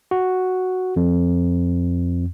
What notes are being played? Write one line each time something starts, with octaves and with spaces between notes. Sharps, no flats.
F#4
F2